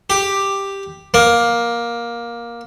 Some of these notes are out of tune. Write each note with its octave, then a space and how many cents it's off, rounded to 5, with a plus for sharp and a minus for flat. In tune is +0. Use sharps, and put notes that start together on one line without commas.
G4 +5
A#3 +10